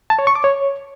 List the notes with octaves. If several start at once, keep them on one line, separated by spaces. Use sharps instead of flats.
A5
C#5
C#6
D6
C#5